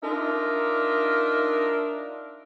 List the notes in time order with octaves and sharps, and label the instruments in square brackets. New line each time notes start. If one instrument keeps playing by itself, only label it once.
[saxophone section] D4 D#4 F4 A#4 E5